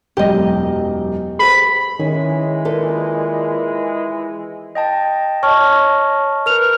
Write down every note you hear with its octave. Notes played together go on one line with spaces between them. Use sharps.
E1 F#2 G4 D#5
A4 C5 B5
D#3 E3 G#3 C#4
A#2 D#4 A4 B4
D#5 G5 A5
C#5 D#5 A5 C#6 F6
A#4 B4 F6 F7